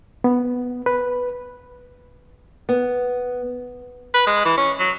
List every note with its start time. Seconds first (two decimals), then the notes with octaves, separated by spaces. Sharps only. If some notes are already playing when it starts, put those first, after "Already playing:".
0.24 B3
0.86 B4
2.69 B3
4.14 B4
4.27 G#3
4.45 E3
4.58 C#4
4.80 F#3